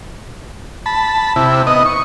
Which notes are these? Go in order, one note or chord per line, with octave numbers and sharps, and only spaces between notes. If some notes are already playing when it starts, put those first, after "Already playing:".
A5 B5
C3 E4
B3 D#4 D#5
C#6